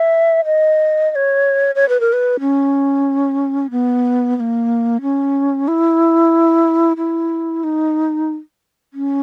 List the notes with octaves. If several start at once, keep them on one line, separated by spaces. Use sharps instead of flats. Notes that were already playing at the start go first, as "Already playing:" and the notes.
Already playing: E5
D#5
D#5
C#5
C#5
B4
A#4
B4
C#4
B3
B3
A#3
C#4
E4
E4
D#4
C#4